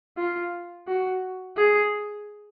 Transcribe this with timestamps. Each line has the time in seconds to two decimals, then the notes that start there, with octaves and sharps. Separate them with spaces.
0.18 F4
0.88 F#4
1.57 G#4